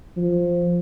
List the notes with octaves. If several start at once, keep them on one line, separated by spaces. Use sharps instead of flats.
F3